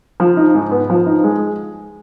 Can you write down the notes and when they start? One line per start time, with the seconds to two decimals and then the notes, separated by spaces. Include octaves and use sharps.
0.20 F3
0.37 D#4
0.55 G#2
0.71 B3
0.90 F3
1.06 D#4
1.24 G#3